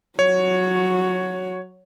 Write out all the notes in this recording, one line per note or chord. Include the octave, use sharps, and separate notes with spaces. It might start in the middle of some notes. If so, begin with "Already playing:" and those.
F#3 F#4 C#5